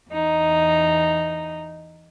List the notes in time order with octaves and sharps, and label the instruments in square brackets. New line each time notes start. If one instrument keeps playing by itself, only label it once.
[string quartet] E2 D#4